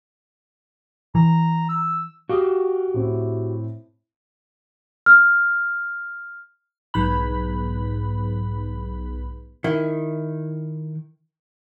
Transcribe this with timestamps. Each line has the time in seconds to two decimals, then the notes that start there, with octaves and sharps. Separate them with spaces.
1.15 E3 A#5
1.69 E6
2.29 F#4 G4 F5 D#6
2.94 A2 C4 E4
5.06 F6
6.94 B1 G#2 B4 B5
9.64 D#3 E4